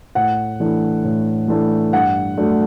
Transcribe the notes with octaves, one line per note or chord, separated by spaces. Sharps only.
A2 F#5
E3 A3 D4
A2
E3 A3 D4
G2 F#5
F#3 A3 D4